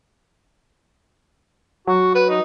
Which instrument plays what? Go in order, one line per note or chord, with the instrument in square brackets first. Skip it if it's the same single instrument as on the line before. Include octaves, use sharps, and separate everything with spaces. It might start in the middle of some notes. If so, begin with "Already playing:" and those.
[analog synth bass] F#3 [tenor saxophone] F#4
[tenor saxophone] B4
D#4